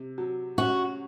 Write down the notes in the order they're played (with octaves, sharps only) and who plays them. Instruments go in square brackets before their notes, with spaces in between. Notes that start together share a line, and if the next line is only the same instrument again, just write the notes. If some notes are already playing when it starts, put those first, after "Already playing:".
Already playing: [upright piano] C3
F#3
[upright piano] C#4 [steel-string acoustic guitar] F#4